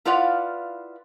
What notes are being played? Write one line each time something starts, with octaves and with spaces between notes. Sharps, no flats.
E4 F4 B4 D5 F5 F#5